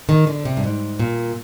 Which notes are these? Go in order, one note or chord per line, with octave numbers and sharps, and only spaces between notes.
D#3
D3
C3
G2
G#2
A#2